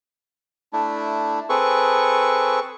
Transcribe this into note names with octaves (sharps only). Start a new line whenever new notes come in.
A3 D4 E4
C4 G#4 A4 B4 C#6